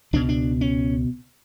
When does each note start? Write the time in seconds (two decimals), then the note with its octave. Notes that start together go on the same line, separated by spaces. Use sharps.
0.13 C#2 B2 D4
0.29 D4
0.61 C#4